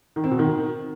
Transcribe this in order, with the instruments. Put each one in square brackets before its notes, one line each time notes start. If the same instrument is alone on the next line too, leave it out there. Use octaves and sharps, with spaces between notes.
[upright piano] D#3
C4
B2
D#3